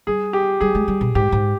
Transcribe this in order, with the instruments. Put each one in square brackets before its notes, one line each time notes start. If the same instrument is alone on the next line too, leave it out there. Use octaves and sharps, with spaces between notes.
[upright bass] G3 [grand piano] G#4
[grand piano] G4
[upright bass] G3 [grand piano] G#4
[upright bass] G#3
G3
B2
[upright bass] G#2 [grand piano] G4
[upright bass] G#2